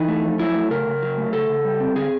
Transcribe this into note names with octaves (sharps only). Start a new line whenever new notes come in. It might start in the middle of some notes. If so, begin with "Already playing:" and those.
Already playing: E3 D#4
A3
F2
F#3 E4
A3
C#3 A#4
C#3
F#3
A3
C#3 A4
C#3
G3
C4
D3 G#4